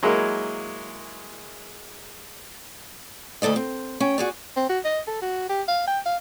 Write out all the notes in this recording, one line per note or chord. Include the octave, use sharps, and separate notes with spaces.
F#3 G#3 A#3 E4
D2 A2 A4 D5 D#5
C4
C#4 G5
F#4 G#4 D5
C4
F#4
D#5
A4
F#4
G4
F5
G5
F5